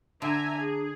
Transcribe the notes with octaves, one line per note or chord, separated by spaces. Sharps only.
D3 D4 E5 G#5 A#5
G#4